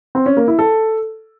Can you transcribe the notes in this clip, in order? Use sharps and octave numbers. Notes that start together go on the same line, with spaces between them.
C4
C#4
A#3
E4
A4